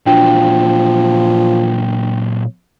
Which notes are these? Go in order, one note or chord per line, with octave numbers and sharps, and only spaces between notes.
A#2 F3 F#3 D4 G5